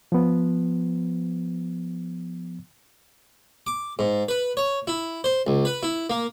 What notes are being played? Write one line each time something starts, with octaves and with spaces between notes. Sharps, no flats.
F3 B3
D6
G#2
B4
C#5
E4
C5
C#2
B4
E4
A#3